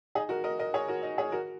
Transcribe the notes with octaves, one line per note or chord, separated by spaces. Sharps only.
D#4 G#4
F#4 A#4
A#4 D#5
A#4 D#5
G#4 C#5
F#4 A#4
D#4
G#4 C#5
F#4 A#4